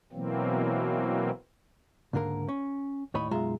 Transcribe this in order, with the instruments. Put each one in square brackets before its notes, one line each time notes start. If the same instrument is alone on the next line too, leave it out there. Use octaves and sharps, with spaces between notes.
[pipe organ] B2 E3 F#3 A#3 C4
[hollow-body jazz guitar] C#2 G#2 D3 A#3 A#4
C#4
D#2 A2 C#5 D#5 B5
B1 F#2 G#3 F4 E5 A#5